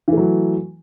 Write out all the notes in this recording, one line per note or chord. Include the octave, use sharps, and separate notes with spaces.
E3 F#3 A3